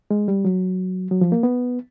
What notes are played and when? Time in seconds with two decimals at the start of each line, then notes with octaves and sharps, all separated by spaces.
0.11 G#3
0.28 G3
0.45 F#3
1.11 F#3
1.21 F3
1.32 A#3
1.43 B3